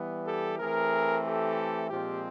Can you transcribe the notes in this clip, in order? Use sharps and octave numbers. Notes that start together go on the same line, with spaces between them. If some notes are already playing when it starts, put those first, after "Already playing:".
Already playing: E3 G3 B3
G4 A4
E3 A3 C4 G#4 A#4
G4 A4
A#2 F3 G#3 C4 F4 G4